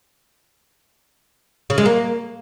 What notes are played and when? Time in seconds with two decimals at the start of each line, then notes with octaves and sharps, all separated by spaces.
1.70 C#3
1.78 G#3
1.85 A#3